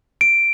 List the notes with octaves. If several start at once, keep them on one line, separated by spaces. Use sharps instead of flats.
D7